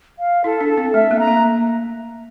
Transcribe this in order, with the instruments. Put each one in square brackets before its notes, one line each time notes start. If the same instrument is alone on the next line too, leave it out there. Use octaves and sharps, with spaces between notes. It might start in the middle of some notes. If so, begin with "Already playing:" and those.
[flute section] F5
[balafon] E4 [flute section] A4
[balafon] D4
[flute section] A4
[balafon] C4
[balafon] A3 [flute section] E5
[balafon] A#3
[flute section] A#5
[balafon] A#3